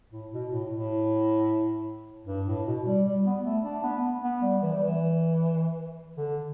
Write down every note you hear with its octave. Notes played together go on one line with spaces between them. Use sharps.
A2
B2
A2
A2
G2
A2
B2
G3
G3
B3
A3
D4
B3
B3
G3
E3
G3
E3
D3